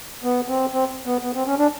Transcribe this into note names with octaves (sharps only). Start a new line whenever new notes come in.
B3
C4
C4
B3
B3
C4
C#4
D4